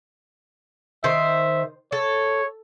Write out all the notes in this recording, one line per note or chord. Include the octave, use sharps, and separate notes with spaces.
D#3 C5 E5
A4 C#5